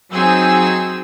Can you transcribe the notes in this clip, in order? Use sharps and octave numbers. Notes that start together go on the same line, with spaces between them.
F#3 C4 D#4 G#4 G#5 E6